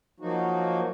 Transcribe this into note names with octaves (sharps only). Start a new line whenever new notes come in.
F3 F#3 A#3 D#4 F#4